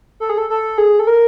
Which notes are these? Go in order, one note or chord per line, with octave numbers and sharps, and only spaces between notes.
A4
G#4
A4
A4
G#4
A4
A#4